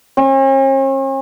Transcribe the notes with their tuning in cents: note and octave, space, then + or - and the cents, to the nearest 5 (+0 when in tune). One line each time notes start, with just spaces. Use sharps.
C#4 -45